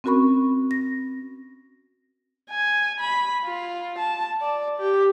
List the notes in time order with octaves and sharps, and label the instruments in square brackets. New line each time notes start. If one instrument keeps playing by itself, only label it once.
[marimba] C4 C#4 F#4 A#4 B5 C#6
A#6
[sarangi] G#5
B5
F4
A5
D5
G4